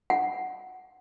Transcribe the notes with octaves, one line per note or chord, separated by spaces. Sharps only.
F#5